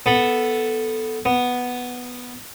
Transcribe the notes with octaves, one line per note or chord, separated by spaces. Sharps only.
B3 A4 B5
B3